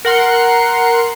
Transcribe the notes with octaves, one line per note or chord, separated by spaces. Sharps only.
A#4 F#5 C6 C#7